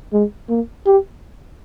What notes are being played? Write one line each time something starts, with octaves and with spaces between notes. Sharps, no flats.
G#3
A#3
G4